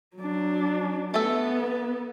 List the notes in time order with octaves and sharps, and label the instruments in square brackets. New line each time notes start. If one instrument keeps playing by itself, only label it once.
[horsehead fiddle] F#3 D4
[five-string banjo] A3 A4 [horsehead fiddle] B3